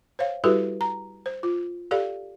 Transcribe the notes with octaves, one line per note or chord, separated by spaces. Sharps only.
C5 C#5 F5
G3 E4 F#4 G4 A4 B4
A#5
C5
F4
G4 A4 D5 F5